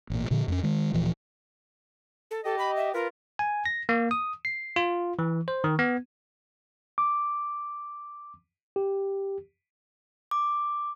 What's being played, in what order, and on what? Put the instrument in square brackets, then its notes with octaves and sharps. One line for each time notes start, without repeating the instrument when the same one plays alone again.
[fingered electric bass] A1 A#2
A#2 D3 F3
F2 A#3 C#4
D#3 G#3
D1 A#2 E3 F3
[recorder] A4
[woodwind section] G4 D#5 [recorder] A4
[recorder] B5
E5
[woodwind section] F4 B4 [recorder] A#4
[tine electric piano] G#5
A#6
A#3
D#6
C7
F4
E3
C5
D#3
B3
D6
G4
[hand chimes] D6